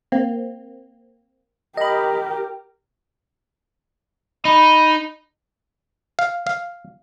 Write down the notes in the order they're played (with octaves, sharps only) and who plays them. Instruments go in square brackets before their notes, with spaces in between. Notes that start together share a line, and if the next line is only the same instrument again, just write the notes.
[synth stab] A#3 C4
[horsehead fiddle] G4 A#4 [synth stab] D#5 B5
[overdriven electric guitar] D#4 [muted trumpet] B5
[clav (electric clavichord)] F5
F5